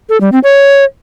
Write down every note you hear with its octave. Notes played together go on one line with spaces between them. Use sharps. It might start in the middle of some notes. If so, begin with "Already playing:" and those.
A4
G3
C4
C#5